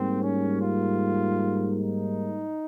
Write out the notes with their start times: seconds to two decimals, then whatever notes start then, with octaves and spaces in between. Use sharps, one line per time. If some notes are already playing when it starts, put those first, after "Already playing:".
Already playing: G#2 G3 A#3 C4
0.22 C#4
0.62 F4
1.79 D#4